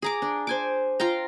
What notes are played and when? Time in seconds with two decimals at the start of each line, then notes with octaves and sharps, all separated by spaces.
0.02 G#4 A#5 D6
0.22 D4
0.47 C5 G#5 D6
1.00 F4 F5 G5 A#5